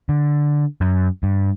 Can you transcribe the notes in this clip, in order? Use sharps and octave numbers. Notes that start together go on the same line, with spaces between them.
D3
F#2
G2